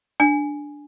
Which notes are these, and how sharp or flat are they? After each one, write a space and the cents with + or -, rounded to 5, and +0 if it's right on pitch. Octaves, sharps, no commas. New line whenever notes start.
D4 +0 G#5 +0